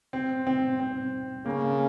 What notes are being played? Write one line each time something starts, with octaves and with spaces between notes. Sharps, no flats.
C4
C4
C4
C#3 A#3